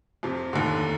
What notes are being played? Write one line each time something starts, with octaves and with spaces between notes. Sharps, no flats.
F2 C3 F3
F1 D#2 D3